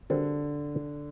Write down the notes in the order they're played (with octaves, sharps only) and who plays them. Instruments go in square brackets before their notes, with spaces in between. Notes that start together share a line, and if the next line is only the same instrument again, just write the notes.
[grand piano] D3 [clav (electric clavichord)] G3 C4 F#4 A#4